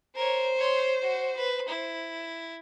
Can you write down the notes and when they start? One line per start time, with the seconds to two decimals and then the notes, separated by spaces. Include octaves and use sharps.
0.16 A#4 C5 C#5
0.56 C#5 C6
1.02 F#4
1.37 B4
1.68 E4